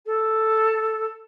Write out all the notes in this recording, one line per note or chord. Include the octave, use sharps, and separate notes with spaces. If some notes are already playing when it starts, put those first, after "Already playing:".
A4